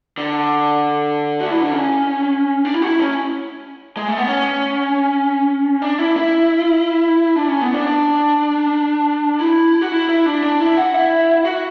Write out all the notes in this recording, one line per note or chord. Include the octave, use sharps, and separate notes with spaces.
D3
F#4
E4
D4
C#4
D4
E4
F#4
E4
C#4
G#3
A3
B3
C#4
D4
E4
E4
D4
C#4
B3
D4
D4
E4
F#4
E4
E4
D4
D4
E4
F#4
E4
F#4